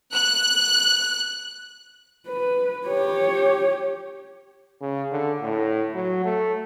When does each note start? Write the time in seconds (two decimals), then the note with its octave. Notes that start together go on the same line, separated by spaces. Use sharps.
0.12 F#6
2.27 B4
2.87 G4 C#5
4.81 C#3
5.12 D3
5.42 A2
5.95 F#3
6.24 A3